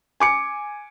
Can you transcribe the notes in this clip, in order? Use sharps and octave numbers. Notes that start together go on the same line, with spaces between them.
G#5 D6 C#7